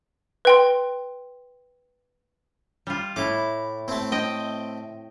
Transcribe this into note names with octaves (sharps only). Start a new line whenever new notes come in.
B4 G5 C6
G3 F4
A2 E4 D6
A3 C4
D#5 G5